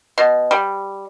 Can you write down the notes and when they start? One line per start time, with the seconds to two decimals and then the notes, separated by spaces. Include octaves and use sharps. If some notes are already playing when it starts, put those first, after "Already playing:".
0.18 B2
0.51 G3